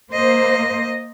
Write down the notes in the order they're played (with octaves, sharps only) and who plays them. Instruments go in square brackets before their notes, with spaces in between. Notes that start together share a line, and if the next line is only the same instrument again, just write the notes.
[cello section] A#3 C5 [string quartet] D#5